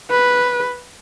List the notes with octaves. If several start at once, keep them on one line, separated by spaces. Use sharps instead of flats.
B4